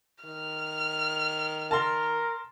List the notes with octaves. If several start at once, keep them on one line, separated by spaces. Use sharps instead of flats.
D#3 F6
A#4 A5 C6